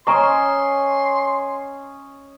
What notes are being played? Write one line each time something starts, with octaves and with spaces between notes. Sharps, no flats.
C#4 D#5 G#5 A#5 C6 C#6